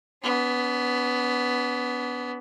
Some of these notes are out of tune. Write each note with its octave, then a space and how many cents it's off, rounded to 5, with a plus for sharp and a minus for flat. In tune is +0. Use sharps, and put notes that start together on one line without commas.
B3 +5 D4 -45